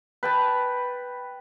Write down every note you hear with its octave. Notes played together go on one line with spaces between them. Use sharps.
B4 G5 A5